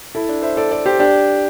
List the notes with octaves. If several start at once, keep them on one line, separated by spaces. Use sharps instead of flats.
E4 A4
D4
C5 E5
A4 D5
A4 D5
G4 C5
D4 G4